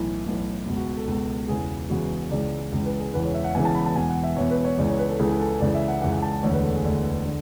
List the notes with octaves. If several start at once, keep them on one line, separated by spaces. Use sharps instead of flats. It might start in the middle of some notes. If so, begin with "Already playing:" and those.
Already playing: B1 A2 E3
B1 A2 E3
C#2 B2
F#4
A4
C#2 B2
E1 E2 C#3 E3 G#4
E1 E2 C#3 E3 F#4
C#2 C#3 E3 D5
C#2 C#3 E3
B4
G#4
E1 E2 C#3 E3 B4
C#5
E5
F#5
E1 E2 C#3 E3 G#5
A5
B5
A5
E1 E2 B2 G#5
F#5
E5
E1 E2 B2 C#5
B4
C#5
C#2 C#3 E3 D5
C#5
B4
A4
C#2 C#3 E3 G#4
G#4
A4
C#2 C#3 E3 D5
E5
F#5
C#2 C#3 E3 F#5
F#5
A5
A5
E1 D2 D3 C#5
B4
A4
G#4
E1 D2 D3
D3